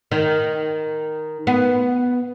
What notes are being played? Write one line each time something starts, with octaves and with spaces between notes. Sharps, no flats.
D#3
B3